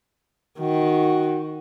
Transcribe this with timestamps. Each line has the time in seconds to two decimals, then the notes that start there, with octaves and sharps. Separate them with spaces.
0.60 D#3 F#4